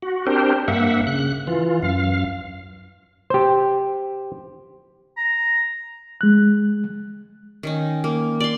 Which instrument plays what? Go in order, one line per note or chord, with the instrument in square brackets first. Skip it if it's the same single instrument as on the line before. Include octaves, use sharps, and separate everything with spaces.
[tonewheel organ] F#4
C4 D4 G4 A#4 C5
G2 A#3 E5 F#5
C#3 F#6
E3 F4
F#2 F5
[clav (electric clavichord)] G4 C5
[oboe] A#5
[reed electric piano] G#3 F#6
[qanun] D#3 C#4 D#4
A#3
D5 C6